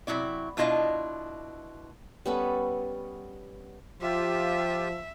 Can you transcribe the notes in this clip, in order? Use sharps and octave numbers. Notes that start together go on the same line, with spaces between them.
C3 F3 F#3 E4 D5
B2 D4 E4 F4 D#5 F5
G3 B3 C#4 A4
F3 F4 G4 E5